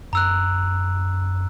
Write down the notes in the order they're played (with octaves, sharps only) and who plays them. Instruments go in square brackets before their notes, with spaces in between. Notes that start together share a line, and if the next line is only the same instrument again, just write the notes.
[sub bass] F#2 [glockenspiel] A#5 E6 F#6